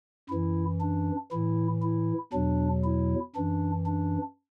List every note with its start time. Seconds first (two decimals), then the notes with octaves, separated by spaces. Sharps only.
0.29 F#2 E3 E4
0.81 D4
1.32 A2 E3 E4
1.82 E4
2.33 E2 B2 F#3 D4
2.84 E4
3.36 F#2 E3 D4
3.86 D4